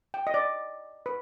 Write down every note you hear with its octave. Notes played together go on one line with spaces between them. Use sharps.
G5
D#5
D5
B4